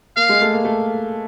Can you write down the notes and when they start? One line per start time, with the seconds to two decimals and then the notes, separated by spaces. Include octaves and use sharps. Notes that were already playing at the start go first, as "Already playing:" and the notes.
0.16 A#3 F5
0.29 G#3
0.41 A3
0.53 A#3
0.65 A3